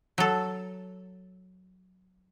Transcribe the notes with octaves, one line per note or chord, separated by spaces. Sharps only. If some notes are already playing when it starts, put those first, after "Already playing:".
F#3 A4